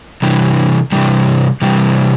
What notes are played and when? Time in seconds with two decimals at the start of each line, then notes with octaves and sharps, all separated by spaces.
0.22 C3 E3 G3
0.92 C3 E3 G3
1.62 C3 E3 G3